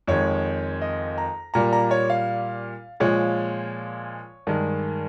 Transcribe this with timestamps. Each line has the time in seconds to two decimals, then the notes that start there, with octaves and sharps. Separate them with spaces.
0.07 F2 D#3 G#3 C#5
0.82 D#5
1.18 A#5
1.54 A#2 G3 A#3 A#5
1.73 A#5
1.91 C#5
2.10 F5
3.00 A#2 F3 G#3 C#5
4.47 G2 D#3 G#3